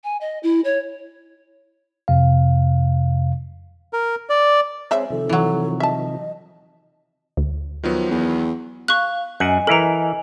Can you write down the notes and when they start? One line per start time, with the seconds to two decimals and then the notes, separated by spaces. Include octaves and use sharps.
0.04 G#5
0.21 D#5
0.43 E4
0.64 C#5
2.08 F2 C3 F5
3.93 A#4
4.30 D5
4.91 G#3 C4 C5 C#5 E5
5.10 C3 D#3 F3 A4
5.29 E3 F#3
5.80 D#5 E5 A5
7.37 D2
7.83 D#3 F3 F#3 B3
8.11 E2
8.88 F5 C#6 F#6
9.40 F#2 D#5 F#5 G#5
9.67 E3 E4 A4 A#4 A#5